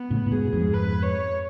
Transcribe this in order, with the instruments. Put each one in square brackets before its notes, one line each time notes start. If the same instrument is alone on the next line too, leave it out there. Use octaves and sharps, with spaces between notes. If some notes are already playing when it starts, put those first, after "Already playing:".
Already playing: [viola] B3
[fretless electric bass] A2 C#3
A2
[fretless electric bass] G#2 B2 [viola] G#4
[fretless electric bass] A2
F2 G#2
[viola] B4
C#5